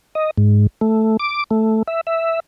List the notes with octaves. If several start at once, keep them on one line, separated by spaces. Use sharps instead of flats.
D#5
G#2
A3
D6
A3
E5
E5